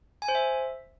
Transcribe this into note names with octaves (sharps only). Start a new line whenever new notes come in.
G#5
C5
E5